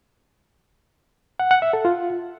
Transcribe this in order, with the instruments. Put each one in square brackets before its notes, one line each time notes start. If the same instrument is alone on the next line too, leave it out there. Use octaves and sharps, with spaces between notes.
[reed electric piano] F#5
F#5
E5
A4
F4